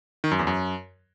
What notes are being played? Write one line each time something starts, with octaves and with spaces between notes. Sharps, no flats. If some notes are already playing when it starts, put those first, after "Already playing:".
D#3
F#2
E2
F#2